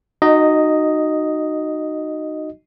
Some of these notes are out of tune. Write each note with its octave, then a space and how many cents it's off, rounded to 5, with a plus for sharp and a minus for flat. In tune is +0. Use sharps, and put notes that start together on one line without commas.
D#4 -20 F#4 +0 D#5 +0